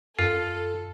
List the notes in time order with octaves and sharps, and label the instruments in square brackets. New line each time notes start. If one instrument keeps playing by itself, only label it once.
[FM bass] F#2 [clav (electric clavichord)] F4 [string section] A4